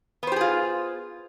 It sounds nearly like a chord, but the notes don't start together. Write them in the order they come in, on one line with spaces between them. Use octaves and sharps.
B3 C5 G4 G#4 F4